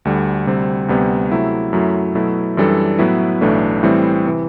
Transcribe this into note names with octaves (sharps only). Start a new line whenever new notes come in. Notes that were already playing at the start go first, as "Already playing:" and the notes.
D2 D3 G3
D2 C3 G3 C4
D2 C3 G3 B3
C3 F#3 A3 E4
F#2 F#3 A3 E4
B2 F#3 A3 E4
F#2 E3 G3 D4 A4
A2 F#3 B3 E4 B4
B1 A2 E3 A3 D4
A2 E3 G3 C4
C3 E3